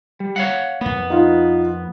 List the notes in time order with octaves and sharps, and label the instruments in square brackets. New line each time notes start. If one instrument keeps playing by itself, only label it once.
[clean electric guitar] G3
C#5 F5 F#5
[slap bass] F2 A#3 [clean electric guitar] B3
[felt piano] D#4 F4